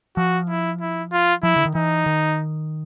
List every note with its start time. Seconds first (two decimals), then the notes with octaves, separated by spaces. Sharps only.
0.17 F3 F#4
0.50 E4
0.81 E4
1.12 F4
1.43 F3 E4
1.56 D3
1.65 D#3
1.75 E3 D#4
2.06 D#3